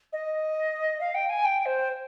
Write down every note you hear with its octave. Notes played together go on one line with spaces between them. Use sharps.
D#5
F5
G5
G#5
G5
C5